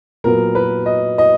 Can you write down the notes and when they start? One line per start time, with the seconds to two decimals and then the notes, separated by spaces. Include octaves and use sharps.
0.24 A#2 F#3 B3 A#4
0.55 B4
0.86 D#5
1.18 D#5